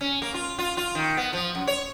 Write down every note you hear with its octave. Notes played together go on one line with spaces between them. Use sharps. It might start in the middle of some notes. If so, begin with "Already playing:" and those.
C#4
A#3
F4
F4
F4
D#3
B3
F3
F#2
C#5